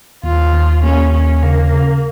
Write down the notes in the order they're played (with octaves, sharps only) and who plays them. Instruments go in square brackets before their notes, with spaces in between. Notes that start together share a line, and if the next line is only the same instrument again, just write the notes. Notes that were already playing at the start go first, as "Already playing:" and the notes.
[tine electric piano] D#2 [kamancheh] F4
[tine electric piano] D#2
[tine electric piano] A#3 [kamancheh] C#4
[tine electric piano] D#2 [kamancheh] C#4
[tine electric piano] C#3 [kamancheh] A#3
[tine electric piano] C#3